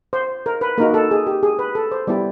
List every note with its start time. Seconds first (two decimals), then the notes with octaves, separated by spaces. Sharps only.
0.13 C5
0.46 A#4
0.61 B4
0.78 A#3 D#4 F#4 A#4
0.94 A4
1.11 G#4
1.27 G4
1.43 G#4
1.59 B4
1.75 A4
1.92 C5
2.07 G3 B3 E4 G4 D5